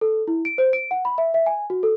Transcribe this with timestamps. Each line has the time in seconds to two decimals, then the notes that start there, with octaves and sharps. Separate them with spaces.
0.01 A4
0.28 E4
0.45 D7
0.58 C5
0.73 D7
0.91 F#5
1.05 B5
1.18 E5
1.34 E5
1.46 G#5
1.70 F#4
1.83 A4